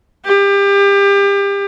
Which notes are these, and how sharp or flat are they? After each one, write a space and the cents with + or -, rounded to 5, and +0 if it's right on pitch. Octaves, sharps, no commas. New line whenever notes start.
G4 +30